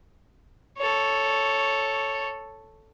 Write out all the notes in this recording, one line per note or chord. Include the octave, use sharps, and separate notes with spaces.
A4 C#5